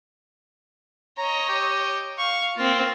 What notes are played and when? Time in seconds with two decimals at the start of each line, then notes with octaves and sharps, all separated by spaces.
1.18 C#5 D#5 A#5
1.49 G4
2.18 F5 C#6
2.57 A#3 C4 F4